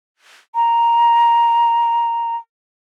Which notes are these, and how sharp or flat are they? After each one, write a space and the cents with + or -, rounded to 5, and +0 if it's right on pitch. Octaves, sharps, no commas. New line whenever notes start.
A#5 +5